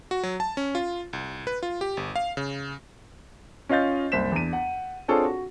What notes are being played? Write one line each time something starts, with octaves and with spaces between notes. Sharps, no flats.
F#4
F#3
A5
C#4
F4
C2
B4
F4
G4
G1
F5
C#3
C#4 F4 D#5 F5 G6 A6
F#1 C2 C5 B6 E7
E2 D4 D#7
F#5
C4 D4 F4 G#4 A4 C#5
F#4